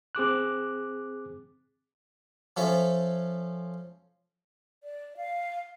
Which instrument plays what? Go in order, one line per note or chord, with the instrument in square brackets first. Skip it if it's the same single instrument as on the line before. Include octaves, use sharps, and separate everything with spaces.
[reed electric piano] C4 G#4 D6 F#6
[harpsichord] F3 C#4 A4 E5
[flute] D5
F5